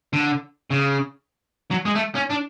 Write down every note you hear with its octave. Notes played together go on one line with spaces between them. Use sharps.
D3
C#3
F#3
G#3
A3
C#4
D4